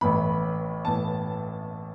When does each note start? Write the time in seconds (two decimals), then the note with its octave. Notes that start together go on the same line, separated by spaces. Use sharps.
0.01 A1 A2 E3 B5
0.85 A2 E3 A5